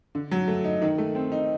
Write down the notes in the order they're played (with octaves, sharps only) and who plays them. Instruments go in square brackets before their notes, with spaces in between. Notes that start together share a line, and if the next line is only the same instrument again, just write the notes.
[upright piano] D3
F#3
A3
D#4
D#3
A3
C4
D#4